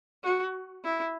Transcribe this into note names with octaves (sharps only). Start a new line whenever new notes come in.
F#4
E4